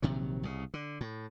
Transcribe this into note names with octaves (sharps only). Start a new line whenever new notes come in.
A#1 C3 D#3 F#3
C2 C#3
D3
A2